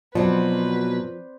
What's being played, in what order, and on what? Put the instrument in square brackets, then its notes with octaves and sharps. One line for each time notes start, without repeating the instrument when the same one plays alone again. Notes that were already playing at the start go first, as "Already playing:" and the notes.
[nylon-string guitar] B2 F#3 [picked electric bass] F3 [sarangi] B4 [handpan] C5 D5